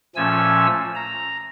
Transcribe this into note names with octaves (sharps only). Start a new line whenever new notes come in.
A#2 F3 A3 C#4 G#5 E6
A#5